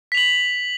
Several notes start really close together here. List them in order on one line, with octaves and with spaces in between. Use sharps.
B6 F7 F#7